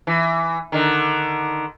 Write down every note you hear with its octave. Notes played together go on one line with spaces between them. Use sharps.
E3
D3 D#3